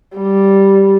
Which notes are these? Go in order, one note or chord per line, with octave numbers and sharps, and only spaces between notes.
G3